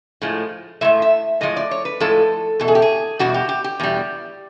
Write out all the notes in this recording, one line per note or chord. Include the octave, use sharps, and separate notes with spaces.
A2 F3 G#3
A2 F3 G#3 E5
E5
A2 F3 G#3 D#5
D5
C#5
B4
A2 F3 G#3 A4
E2 B2 A4
G#4
G4
G#4
E2 B2 G3 F#4
G4
G4
G4
E2 B2 G3